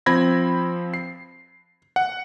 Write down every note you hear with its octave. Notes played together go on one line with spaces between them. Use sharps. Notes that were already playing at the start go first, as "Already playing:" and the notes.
F3 C4 B5 G#6 A#6
C7
F#5